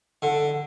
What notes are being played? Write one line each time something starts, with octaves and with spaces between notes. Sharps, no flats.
D3